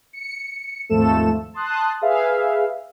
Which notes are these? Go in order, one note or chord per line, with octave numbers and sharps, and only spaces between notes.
C#7
G#1 D#2 F3 A3 A4 E7
A5 C6 D#6 F#6
G#4 B4 E5 F5